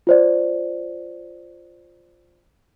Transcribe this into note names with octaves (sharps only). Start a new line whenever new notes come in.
F4 C5 D5